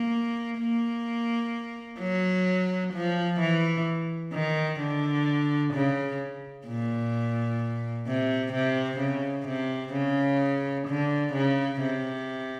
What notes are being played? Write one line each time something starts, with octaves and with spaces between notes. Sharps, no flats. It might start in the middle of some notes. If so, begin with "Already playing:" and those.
Already playing: A#3
A#3
F#3
F3
E3
D#3
D3
C#3
A#2
C3
C3
C#3
C3
C#3
D3
C#3
C3